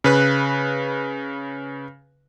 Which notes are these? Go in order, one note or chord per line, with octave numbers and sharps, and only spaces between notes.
C#3 B4 F#6